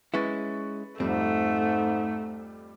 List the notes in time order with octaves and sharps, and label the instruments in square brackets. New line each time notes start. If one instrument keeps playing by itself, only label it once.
[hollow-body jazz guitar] G#3 C#4 E4 [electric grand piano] B4 C#6 A6
[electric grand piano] F2 G3 [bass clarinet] G#2 [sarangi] A3 [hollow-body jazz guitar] C4